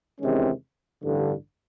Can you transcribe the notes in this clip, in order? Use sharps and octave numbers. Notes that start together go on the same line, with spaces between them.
E2 C3 D#3 G#3 C#4
A1 G2 D3